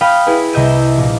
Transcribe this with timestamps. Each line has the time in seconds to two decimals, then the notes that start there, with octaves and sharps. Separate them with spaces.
0.01 F5 G5 B5 D#6 D#7
0.26 E4 G#4 B4
0.53 C2 C3 D#5 E5 G6 D#7
0.97 A#1